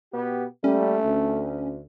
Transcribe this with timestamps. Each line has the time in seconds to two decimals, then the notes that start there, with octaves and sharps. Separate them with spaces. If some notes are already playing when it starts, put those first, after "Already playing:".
0.13 B2 B3 G4
0.64 G3 A3 A#3 C#4
1.05 D2